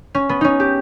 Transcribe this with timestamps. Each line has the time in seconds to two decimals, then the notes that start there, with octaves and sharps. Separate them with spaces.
0.15 C#4
0.29 B3
0.41 C#4 D#4
0.60 G4